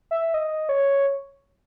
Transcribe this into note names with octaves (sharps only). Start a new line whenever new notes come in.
E5
D#5
C#5